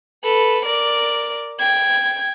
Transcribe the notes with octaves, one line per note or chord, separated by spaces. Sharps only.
A4 B4
A#4 D5
G5 G#6